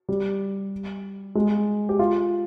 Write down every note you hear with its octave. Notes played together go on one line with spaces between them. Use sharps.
G3
G#3
G4
F4